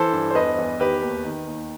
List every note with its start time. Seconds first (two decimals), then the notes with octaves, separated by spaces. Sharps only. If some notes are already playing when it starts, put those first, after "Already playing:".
Already playing: E3 A4 C5
0.13 G2
0.31 C5
0.35 E2 B4 D#5
0.58 E2
0.80 D#3 G4 B4
1.02 D#2
1.25 D#3
1.47 D#2